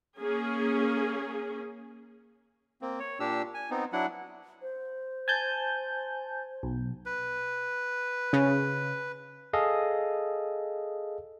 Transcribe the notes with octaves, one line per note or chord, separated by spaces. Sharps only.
A#3 C#4 G#4
A#3 C4
C#5
A#2 D4 G4 E6
G#5
B3 C4 D#4
F#3 D4 E4 F#5
C5
G#5 A5 G6
B1
B4
C#3
G#4 A4 D#5 F5